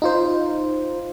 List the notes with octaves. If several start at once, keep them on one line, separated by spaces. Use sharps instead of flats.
D#4 F4 C5